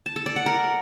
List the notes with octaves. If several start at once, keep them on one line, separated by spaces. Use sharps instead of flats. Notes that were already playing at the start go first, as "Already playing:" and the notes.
A5
A4
D5
F#5
A#4